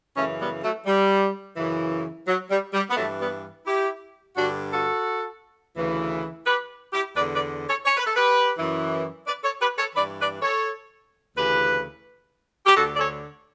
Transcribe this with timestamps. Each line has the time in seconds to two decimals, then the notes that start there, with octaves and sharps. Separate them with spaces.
0.17 F#2 C#3 E3 A3 C#4
0.40 G3 B3
0.63 F#3 A3
0.86 G3
1.57 F#2 C#3 E3
2.27 F#3
2.50 G3
2.73 G3
2.90 B3
2.96 G2 E3 F#3 A3
3.20 G3 B3
3.66 E4 G4
4.37 G2 D3 D4 F#4
4.72 F#4 A4
5.76 D2 C#3 E3
6.46 G4 B4
6.92 E4 G4
7.16 E2 D3 B4 D5
7.33 B4 D5
7.68 A4 C#5
7.86 C#5
7.97 B4
8.07 A4
8.16 G4 B4
8.56 F#2 E3
9.26 B4 D5
9.43 A4 C#5
9.61 G4 B4
9.79 A4 C#5
9.95 G2 E3 B4 D5
10.20 B4 D5
10.42 A4 C#5
11.36 D2 C#3 E3 G4 B4
12.66 G4
12.76 D2 D3 F#4 A4
12.94 D5
12.99 A4 C#5